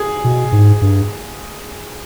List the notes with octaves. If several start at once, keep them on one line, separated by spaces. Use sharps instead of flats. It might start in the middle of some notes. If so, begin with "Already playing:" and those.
Already playing: G#4
B2
G#2
G2